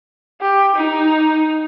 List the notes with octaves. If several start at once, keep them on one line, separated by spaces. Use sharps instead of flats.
G4
D#4